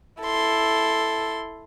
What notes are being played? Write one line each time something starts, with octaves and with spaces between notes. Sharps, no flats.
E4 A4 C6